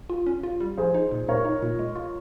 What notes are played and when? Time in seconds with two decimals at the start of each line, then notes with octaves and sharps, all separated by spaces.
0.10 F4
0.26 C#4
0.43 F4
0.60 G3
0.77 F3 G#4 C5
0.94 D#4
1.12 A#2
1.28 A#2 A#4 C#5
1.45 D#4
1.62 A#2
1.79 G#3
1.96 F4